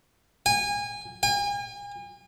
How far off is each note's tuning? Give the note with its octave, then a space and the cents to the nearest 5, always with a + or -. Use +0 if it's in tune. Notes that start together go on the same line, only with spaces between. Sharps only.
G#5 -25
G#5 -40